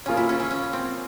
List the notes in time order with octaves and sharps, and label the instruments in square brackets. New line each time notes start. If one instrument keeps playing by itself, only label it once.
[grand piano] A#3 F4 G#4 C#5 [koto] C#4
[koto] E4
C#4
C#4
C#4
C4